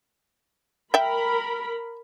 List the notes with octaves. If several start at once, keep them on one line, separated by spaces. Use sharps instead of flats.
A#4 E5 G5 B5